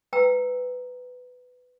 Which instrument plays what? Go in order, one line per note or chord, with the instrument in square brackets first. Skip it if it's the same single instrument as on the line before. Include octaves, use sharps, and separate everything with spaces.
[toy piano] B4 G5 A#5 E6